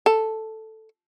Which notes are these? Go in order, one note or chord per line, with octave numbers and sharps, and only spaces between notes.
A4